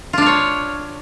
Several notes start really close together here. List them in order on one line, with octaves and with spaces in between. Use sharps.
F4 D4 F5 C#5